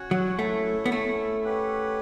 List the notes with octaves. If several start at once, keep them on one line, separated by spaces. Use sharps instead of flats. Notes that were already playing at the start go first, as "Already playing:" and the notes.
Already playing: C#4 F#4 C#5 F#5
F#3
A3 C#4 E4 A4
B3
A3
C#4 G4 B4 F#5